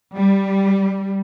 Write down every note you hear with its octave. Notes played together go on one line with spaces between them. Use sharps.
G3